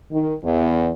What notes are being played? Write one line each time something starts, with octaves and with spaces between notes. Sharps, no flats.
D#3
E2